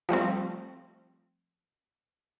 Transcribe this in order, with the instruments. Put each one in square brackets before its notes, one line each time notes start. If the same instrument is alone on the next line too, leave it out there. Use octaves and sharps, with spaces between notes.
[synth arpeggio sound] F3 G3 A3 C4